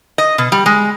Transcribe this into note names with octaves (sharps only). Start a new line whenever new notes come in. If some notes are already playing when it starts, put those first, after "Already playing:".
D#5
B2
G3
G#3